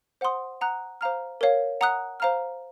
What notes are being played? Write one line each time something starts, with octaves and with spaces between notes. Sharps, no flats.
C5 F#5 C6 D#6
F#5 A#5 D#6 F#6
C5 F5 A#5 F6
A#4 C#5 F5
F#5 A#5 D#6 F#6
C5 F5 A#5 F6